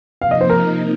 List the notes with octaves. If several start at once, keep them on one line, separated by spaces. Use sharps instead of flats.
C3 F3 A#3 D#4 F5
D#5
C5
A#4